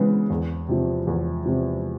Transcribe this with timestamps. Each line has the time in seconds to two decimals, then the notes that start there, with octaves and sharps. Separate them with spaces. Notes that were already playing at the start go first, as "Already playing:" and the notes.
Already playing: C#3 E3 G#3 B3
0.30 E2
0.68 C3 F3
1.07 E2
1.46 C3 F3